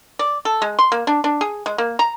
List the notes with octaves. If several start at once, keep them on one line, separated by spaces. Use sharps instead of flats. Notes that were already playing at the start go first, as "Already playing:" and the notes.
D5
A4
G#3
C6
A#3
D4
D4
G#4
G#3
A#3
A#5